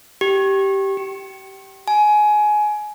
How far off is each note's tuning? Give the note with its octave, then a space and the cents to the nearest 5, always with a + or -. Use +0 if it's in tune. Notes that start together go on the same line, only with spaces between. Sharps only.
G4 -10
G4 -30
G#5 +20